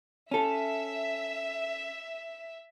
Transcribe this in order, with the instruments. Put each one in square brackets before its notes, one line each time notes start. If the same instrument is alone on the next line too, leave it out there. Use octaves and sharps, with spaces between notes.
[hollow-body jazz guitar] C#4 A4 [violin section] E5